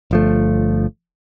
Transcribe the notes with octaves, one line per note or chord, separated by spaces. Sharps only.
G1 F3 A3